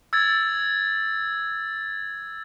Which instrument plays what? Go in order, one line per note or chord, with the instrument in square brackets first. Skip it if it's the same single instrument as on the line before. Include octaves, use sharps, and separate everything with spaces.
[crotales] E6 G#6 A6